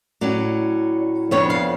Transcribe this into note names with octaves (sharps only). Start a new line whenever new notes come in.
A2 F#3 C#4 D5
F2 F3 B3 D4 C#5
F5